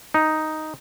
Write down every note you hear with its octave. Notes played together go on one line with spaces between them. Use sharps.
D#4